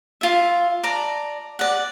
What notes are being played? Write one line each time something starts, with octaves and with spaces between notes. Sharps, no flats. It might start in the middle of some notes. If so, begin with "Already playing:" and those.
F4 E5
D5 A5 A#5
D5 F#5